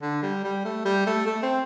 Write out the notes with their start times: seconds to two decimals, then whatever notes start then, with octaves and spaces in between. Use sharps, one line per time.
0.02 D3
0.23 G3
0.44 G3
0.64 A3
0.85 G3
1.06 A3
1.26 A3
1.43 C4